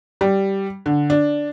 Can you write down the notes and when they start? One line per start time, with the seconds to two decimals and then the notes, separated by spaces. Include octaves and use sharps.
0.21 G3
0.86 D3
1.10 D4